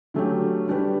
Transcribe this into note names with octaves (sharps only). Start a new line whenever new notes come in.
D3 F#3 A3 C#4 G4
D3 G3 D4 G4 B4